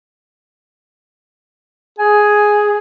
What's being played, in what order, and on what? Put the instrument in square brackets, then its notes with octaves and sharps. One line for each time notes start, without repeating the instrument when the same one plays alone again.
[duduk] G#4 [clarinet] G#5